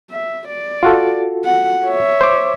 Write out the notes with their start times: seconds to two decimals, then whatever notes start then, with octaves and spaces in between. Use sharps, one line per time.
0.11 E5
0.49 D5
0.83 F4 F#4 A4
1.45 F#5
1.85 C#5 E5
2.21 C5 D6